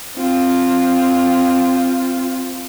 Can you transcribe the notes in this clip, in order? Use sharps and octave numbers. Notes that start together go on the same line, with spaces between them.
C4 F4